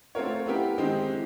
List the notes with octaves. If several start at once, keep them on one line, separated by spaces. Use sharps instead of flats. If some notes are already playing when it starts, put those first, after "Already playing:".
A3 C4 F4 A#4 C#5
B3 E4 G4 A#4
D#3 G#3 C4 D#4 G4
E3